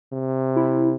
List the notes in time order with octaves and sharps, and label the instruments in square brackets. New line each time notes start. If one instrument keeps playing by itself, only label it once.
[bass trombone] C3
[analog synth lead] E4